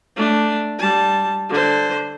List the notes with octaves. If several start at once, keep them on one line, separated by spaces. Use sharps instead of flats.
A3 D4
G3 A5
D3 C5